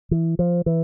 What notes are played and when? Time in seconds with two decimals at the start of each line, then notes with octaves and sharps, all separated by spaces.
0.11 E3
0.39 F3
0.66 E3